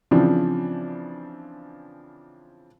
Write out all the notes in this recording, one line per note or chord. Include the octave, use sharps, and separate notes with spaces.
C#3 E3 F3 C4 D4